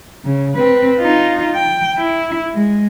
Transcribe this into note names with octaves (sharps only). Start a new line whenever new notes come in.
C#3
C4 B4
D#4 F4
G5
E4
G#3